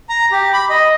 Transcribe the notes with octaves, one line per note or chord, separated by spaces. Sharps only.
A#5
G4
B5
D#5